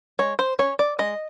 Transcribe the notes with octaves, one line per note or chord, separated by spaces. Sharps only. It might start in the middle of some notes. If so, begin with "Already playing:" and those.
G#3 C#5
C5
C#4 C#5
D5
G#3 D#5